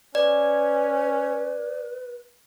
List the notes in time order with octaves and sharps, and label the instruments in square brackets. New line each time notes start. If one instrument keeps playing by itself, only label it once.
[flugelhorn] C#4 [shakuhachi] B4 [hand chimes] D5